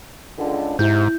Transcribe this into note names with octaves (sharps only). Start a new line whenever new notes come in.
C#2 D3
G#2 C3 E4 G6